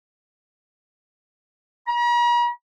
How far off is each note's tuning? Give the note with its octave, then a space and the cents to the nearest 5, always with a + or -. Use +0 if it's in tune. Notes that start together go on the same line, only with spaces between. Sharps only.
A#5 +45